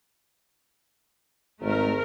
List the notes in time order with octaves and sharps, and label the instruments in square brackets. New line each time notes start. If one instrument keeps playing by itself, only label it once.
[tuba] G#1 [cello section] A3 A#4